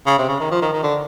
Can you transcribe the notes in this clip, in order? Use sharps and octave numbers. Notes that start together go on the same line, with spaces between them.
C#3
C3
C#3
D#3
F3
D#3
D#3
D3